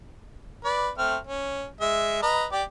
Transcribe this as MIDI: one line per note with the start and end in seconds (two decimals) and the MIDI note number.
0.65 0.90 71
0.65 0.90 74
0.98 1.17 57
0.98 1.17 60
0.98 1.17 89
1.27 1.66 61
1.81 2.21 56
1.81 2.21 76
2.23 2.45 71
2.23 2.45 75
2.23 2.45 82
2.52 2.63 67
2.52 2.63 74
2.52 2.63 86